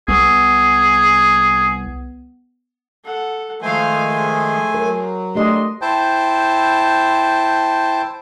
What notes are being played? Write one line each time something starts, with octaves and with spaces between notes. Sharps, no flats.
C2 B3 G#4
A4 F#5
D#3 F3 G#3 A3 C5 F5 G#5
G#4 C5
F#3 A#4
A3 D4 G4 D#5 C6
E4 C5 G5 A5